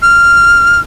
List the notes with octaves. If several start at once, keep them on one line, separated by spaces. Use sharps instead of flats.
F6